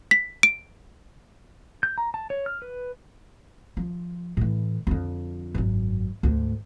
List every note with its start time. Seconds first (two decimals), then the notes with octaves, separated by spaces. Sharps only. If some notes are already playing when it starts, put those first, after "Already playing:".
0.11 B6
0.43 D7
1.83 G6
1.98 A#5
2.14 A5
2.30 C#5
2.46 F6
2.62 B4
3.77 F3
4.37 A2 E3
4.87 F2 D3
5.55 G#1 F#2
6.23 D2 G#2